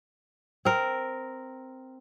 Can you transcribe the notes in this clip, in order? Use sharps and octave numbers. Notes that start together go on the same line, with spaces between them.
C4 A#4